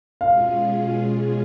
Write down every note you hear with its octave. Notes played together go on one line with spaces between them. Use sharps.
B2 G#3 C#4 F4 G#4 F5